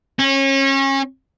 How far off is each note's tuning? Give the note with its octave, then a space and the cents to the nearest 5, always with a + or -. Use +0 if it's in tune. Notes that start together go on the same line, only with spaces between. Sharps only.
C#4 -30